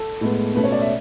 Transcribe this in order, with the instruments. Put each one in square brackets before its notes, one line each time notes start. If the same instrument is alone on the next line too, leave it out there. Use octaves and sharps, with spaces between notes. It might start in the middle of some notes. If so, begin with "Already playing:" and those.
Already playing: [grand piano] A4
A2 G#3 B3
B2 A3 C#4 B4
C#5
D5
E5